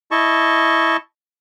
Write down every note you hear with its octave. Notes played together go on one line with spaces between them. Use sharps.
E4 D#5 A5 C#6